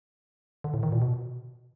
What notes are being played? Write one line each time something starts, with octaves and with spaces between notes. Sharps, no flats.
D3
A2
D#3
A#2
B2